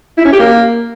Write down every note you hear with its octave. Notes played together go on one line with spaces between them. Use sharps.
E4
C#4
G4
A#3